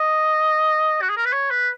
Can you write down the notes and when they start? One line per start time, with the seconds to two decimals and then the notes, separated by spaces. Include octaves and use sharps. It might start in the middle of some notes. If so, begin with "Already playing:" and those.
Already playing: D#5
1.02 F#4
1.09 G#4
1.17 A#4
1.25 B4
1.32 C#5
1.50 B4